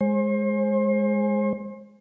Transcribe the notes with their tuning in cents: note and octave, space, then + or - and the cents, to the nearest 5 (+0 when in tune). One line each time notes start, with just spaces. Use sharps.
G#3 +0 C5 +35